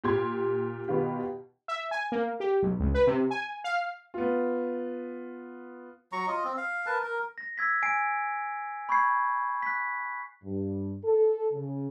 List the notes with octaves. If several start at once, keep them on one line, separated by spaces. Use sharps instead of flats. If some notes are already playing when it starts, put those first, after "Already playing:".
A#2 G4 C6 G#6
B2 D#3 B3 F4 G4
E5
G#5
A#3
G4
B1
C#2
B4
C3
G#5
F5
B3 F4
F#3 A#5 C#6
F4 D#5
C4
F5
A#4 B4 A5
A#4
A#6
E6 G#6 B6
G#5 C7 D7
B5 C#6 G6 G#6 C7
F#6 B6
G2
A4
C#3